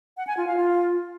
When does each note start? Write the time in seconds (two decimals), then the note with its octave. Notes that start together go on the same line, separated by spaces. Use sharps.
0.17 F#5
0.27 G#5
0.37 F4
0.47 F5
0.57 F4